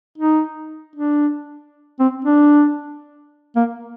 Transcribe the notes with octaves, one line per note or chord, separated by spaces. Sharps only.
D#4
D4
C4
D4
A#3